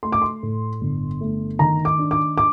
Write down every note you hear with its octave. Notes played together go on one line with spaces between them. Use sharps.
A3 C6
D6
C6
A2
G1
A3
D#3 A#5
D6
D4
D6
D6